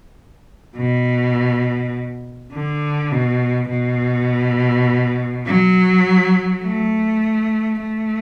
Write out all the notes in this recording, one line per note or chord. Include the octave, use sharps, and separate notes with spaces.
B2
D3
B2
B2
F#3
A3
A3